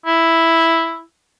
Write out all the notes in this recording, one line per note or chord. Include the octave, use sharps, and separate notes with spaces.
E4